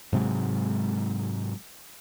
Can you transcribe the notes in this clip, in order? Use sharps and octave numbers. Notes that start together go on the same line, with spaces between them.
G#2 C3 F#3 G#3